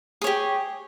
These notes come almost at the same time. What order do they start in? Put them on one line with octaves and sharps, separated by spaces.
G#4 C#5 G4